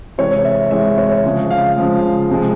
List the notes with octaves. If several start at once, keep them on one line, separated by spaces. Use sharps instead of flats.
C3 E3 G#3 C#5
E5
C3 E3 G#3 E5
C#5
C#3 F3 G#3
F5
C#3 F3 G#3
C3 F3 G#3